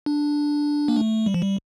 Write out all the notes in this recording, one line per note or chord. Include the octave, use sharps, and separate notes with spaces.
D4
A#3
A3
G3
F3
G3